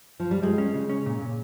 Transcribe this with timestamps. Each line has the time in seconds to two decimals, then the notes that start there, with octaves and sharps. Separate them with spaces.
0.20 F3
0.31 G3
0.42 G3 G#3
0.58 C#4
0.74 C#3
0.89 C#4
1.06 A#2
1.22 A#2